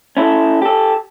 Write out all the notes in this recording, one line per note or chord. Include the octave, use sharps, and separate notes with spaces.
C#4 E4 A4
G4 A4